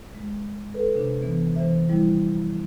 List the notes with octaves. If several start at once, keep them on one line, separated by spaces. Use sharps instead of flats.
G#3
A4 B4
C3 D4
E3 B3
E3 C5 E5
F3 G3 E4